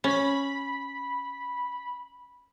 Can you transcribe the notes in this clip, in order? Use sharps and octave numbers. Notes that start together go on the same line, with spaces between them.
C#4 B5